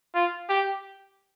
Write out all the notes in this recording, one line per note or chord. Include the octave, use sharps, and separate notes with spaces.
F4
G4